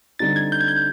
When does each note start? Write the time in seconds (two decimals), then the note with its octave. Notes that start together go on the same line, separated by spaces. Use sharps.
0.19 D3 G3 C4 D#4 A6
0.36 G#6
0.52 G6
0.61 G#6
0.68 G6